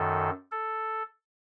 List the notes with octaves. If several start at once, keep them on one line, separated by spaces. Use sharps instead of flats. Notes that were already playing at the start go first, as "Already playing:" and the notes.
Already playing: F#2 D#3 A4
A4